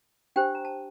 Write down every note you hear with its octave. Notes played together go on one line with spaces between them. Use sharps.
D4 G4 C5 G5
A#5
A5